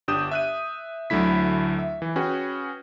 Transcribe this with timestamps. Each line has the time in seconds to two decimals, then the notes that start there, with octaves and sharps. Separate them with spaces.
0.08 G1 D4 G4 D#6 G6 E7
0.31 E5 F#6 D#7
1.10 D2 D3 F#3 A3 E4 B6
1.79 E5
2.02 E3
2.16 C#4 F#4 G#4 B4 G5